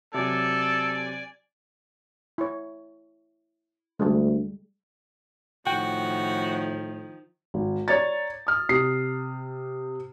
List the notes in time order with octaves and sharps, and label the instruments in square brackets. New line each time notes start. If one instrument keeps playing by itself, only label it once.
[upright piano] C3 F#3 [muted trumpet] A4 [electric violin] D5 G#5
[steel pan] E4 C#5
[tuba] D2 [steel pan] G3 G#3
[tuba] A2 [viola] D#3 F3 [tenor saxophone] F#4 [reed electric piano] G5
[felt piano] G#1
C#5 D5 A#5 A6
D#6 F6
C3 D#6 C7